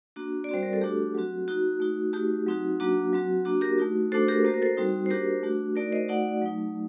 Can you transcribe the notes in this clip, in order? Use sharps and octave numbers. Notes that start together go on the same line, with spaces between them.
A#3 D4 F#4
D5
G3 C4 F#4 C5
A#4
A4
A3 D4 F#4 G4
F#3 C4 F#4
A#3 D#4 F#4
A3 D#4 F#4
A3 D#4 F#4 G4
F#3 C4 D#4 F#4
F#3 A#3 D4 F#4
F#3 C4 F#4
A#3 D4 F#4
G4 A#4
A3 D#4 F#4
A3 D4 F#4 A4 C5
G4 A#4
A#3 F#4 C5
A#4
A4 C5
G3 C4 D#4 F#4
C5
A#3 D4 F#4 G4 A#4
A3 D4 F#4
A3 D#4 F#4 A#4 D5
C5 D#5
A3 D#4 F#4 D5 F#5
F#3 A3 D#4